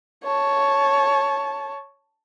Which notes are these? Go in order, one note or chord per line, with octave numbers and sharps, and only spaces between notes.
C#5 A5